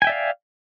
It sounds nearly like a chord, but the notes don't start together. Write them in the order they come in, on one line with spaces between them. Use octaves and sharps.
G#5 G5 E5 D5 F5